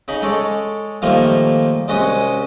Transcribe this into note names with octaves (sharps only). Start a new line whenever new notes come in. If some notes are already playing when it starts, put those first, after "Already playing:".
C#3 D#4 B5
G#3 A4 C#5 D5
A#2 D#3 F3 G3 A3 A#3
C2 G#3 C#4 F#4 C6 D#6